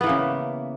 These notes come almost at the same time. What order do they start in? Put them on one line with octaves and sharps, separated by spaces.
B3 E3 A#3 C#3